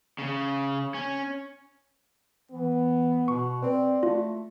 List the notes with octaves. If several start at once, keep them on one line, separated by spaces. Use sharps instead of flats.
C#3
C#4
E3 B3
B2 C#6
C4 B4 D5
A3 F4